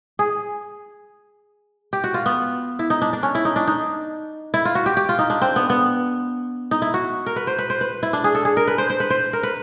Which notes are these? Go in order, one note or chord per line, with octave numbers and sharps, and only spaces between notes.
G#4
G4
F#4
F4
B3
E4
D#4
D4
D4
C#4
E4
D#4
D4
D#4
E4
F4
F#4
G4
G4
F4
D#4
D4
C4
B3
B3
D#4
E4
F#4
A#4
B4
C5
B4
C5
B4
E4
D4
G#4
A4
G#4
A#4
B4
C5
C5
B4
C5
A#4
B4